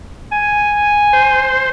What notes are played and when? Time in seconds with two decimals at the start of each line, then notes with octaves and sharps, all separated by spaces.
0.32 G#5
1.13 C5